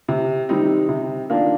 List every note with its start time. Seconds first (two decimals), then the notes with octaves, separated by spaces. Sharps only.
0.08 C3
0.49 D#3 G3 C4 D#4
0.89 C3
1.29 D#3 A#3 D4 F4